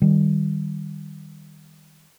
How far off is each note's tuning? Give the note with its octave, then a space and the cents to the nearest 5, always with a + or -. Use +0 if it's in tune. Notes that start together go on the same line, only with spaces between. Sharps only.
D#3 -10 G3 +0